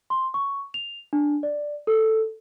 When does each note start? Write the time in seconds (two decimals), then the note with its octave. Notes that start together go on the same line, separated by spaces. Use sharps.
0.10 C6
0.34 C#6
0.74 F7
1.13 D4
1.43 D5
1.87 A4